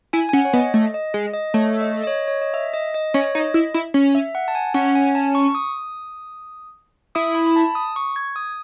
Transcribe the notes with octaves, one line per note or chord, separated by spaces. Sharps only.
E4 G#5
G#5
C#4 F#5
C#5
B3 D#5
A3
D#5
G#3
D#5
A3 C#5
D#5
D#5
C#5
C#5
D#5
E5
D#5
D#5
C#4 C#5
D#4
D#5
E4
E4
C#4
E5
F#5
A5
G#5
C#4 F#5
G#5
A5
C#6
D#6
E4 D#6
B5
B5
A5
D#6
C#6
G#6
D#6